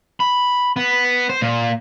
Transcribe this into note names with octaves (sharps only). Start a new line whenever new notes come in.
B5
B3
C5
A#2